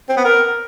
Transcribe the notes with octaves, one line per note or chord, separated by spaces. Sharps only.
C4
B3
A#4